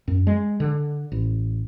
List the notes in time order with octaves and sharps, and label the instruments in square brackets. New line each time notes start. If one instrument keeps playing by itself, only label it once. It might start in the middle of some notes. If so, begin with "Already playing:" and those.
[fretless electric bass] F#2
G#3
D3
A1